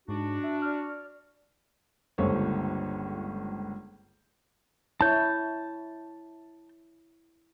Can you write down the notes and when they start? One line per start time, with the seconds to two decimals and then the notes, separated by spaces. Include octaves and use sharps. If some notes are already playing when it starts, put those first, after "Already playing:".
0.08 G#2 D4 F#4
0.44 E5
0.62 D5 F6
2.18 G1 C#2 A#3 A4 C5 C#5
5.01 E4 C#5 A5 G6